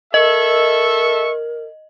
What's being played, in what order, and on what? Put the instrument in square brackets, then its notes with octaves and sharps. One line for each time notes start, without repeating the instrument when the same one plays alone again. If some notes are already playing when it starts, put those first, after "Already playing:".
[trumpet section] A4 E5 C#6 [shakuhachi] A#4 [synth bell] D#5